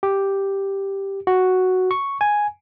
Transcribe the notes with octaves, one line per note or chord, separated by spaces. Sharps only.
G4
F#4
C#6
G#5